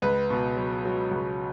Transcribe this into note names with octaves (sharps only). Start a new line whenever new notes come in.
C#2 B4
B2
F#3
F#3
C#2